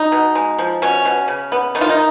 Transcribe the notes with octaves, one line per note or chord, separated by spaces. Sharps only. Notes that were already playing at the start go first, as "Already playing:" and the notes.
Already playing: D#4
B2
G#3
F3
B2 C#4
B2
C#3
B3
D#3 D#4
F4
D#4